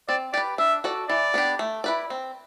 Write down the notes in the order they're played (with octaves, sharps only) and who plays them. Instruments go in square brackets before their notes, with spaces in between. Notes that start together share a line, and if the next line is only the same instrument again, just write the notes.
[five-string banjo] C4 [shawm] D5
[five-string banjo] G4 B4 [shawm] D5
[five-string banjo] D4 [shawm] E5
[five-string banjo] F#4 A4 D5
[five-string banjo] E3 [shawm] D5
[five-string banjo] B3 D4 G4
A3
E4 B4 D5
C4